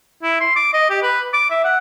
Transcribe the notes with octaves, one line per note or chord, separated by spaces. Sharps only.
E4
C6
D6
D#5
G4
B4
D6
E5
F#5